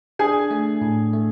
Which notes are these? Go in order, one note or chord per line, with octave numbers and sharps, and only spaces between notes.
D4 G#4 G#5
A3
A2
A3